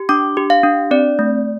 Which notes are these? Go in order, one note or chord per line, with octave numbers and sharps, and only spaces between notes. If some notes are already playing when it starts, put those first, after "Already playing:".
Already playing: G4
D4 D6
G4
F5
D4
C4 D5
A3